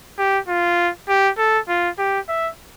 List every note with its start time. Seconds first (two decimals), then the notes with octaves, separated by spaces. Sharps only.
0.18 G4
0.48 F4
1.09 G4
1.38 A4
1.69 F4
1.99 G4
2.29 E5